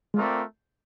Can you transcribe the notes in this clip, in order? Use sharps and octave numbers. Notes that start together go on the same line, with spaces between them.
G#3 A3 C4 F4 A#4 D5